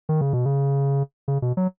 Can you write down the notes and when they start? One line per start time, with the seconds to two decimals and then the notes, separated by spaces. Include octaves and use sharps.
0.09 D#3
0.21 C#3
0.33 B2
0.45 C#3
1.28 C#3
1.42 B2
1.57 F#3